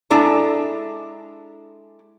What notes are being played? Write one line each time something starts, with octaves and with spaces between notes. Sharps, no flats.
G#3 D4 E4 A4 A#5